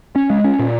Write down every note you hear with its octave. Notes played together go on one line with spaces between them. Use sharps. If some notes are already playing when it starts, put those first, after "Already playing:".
C#4
G#3
C#4
A#2